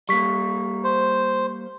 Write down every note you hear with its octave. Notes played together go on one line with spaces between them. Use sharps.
G3 A#3 C#6 B6
C5